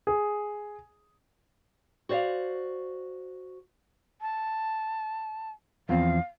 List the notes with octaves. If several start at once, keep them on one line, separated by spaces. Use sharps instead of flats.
G#4
F#4 C5 D5 F5
A5
E2 F3 C4 F5